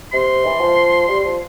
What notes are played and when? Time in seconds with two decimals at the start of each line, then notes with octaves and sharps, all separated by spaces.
0.12 C3 C6
0.45 E3
0.61 F3
1.08 G3
1.24 F3